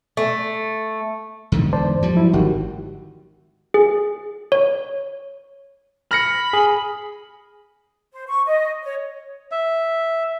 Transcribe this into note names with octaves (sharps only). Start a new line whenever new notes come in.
A3
E2 G#2 D3
C5 D5 A5
F3 G3
F#3 E4
G#1 D#3 F#4 G4
G#4
C#5
B5 F6 A#6 C#7
G#4
C5
C#6
D#5
C#5
E5